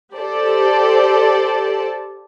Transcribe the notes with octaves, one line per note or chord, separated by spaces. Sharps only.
G4 A4 C5 D5 A5